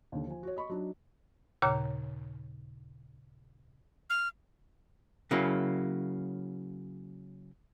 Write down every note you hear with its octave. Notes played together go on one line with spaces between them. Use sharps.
D#2 D3
F3 G#5
F#4 C#5
D#5 B5 C#6
F#3 D4 D#4
D#2 A#2 C#3 C#5 A#5 G6
F6
C#3 F#3 A#3 E4